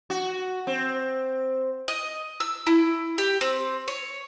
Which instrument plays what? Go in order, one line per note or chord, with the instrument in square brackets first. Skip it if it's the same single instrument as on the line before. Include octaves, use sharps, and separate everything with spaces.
[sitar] F#4
C4
[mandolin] D#5
E6
E4
G4
C4
C#5